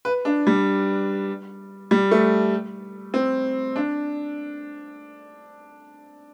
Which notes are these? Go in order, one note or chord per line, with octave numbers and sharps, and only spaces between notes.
B4
D4
G3
G3
A3
C4
D4